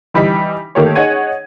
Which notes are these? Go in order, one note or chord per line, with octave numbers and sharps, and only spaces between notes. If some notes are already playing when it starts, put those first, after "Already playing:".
E3 G3 D#4 B6
D#3 A3 A#3 G4 C#5
D#4 G#4 C#5 F#5 G#6 D#7